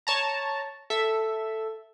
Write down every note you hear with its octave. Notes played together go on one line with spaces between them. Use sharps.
C#5 A5 A#5
A4 E5